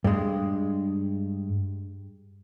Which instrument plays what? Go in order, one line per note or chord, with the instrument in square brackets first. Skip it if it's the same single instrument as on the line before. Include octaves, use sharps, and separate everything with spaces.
[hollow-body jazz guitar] G2 G#3